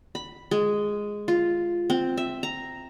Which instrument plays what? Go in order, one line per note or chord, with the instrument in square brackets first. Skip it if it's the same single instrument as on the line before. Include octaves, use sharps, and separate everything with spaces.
[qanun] B5
G#3
F4
C4
E5
A#5